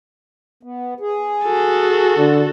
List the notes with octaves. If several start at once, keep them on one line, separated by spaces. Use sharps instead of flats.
B3
G#4
F#4 A4
D3